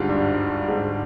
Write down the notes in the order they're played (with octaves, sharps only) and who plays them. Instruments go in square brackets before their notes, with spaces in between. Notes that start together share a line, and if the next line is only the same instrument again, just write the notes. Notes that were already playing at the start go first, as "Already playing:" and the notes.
Already playing: [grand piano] D2 D3 G3 D4 F4 [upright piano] G#2
[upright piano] G2
G#2